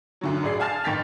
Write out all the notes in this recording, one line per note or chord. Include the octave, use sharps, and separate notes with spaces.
F#2 D3 F#3
A1 G#4 D5 C7
F5 G#5 A5 F6 A6
A1 D#3 G5 A6 B6 F7